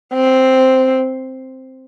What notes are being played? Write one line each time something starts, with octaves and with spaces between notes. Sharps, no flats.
C4